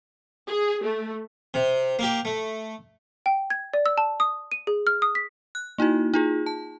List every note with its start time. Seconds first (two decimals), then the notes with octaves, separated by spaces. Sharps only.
0.49 G#4
0.84 A3
1.54 C3
1.99 A#3 G4
2.25 A3
3.26 G5
3.50 G#6
3.73 D5
3.86 E6
3.98 A5
4.20 D#6
4.52 D#7
4.67 G#4
4.87 F6
5.02 D#6
5.15 B6
5.55 F#6
5.78 A#3 D#4 E4 F#4
6.14 D#4 F4 G#4
6.46 A5